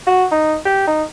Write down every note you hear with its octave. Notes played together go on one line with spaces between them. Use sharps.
F#4
D#4
G4
D#4